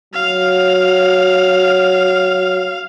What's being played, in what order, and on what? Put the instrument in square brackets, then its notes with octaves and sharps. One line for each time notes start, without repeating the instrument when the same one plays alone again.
[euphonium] F#3 [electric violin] F5